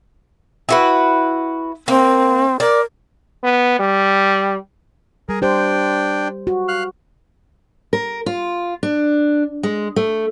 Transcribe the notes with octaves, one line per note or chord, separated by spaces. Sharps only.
E4 F#4 B4
A#3 C4
A#4 D5
B3
G3
G3 G#4 A#4
D4 G4 C5 G5
F#4
F5 F6 F#6
A#4
F4
D4
G#3
A3